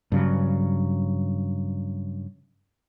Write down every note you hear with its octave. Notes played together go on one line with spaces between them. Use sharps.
G2 C#3 F#3